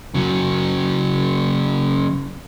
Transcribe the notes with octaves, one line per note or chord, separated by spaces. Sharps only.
C#3 F#3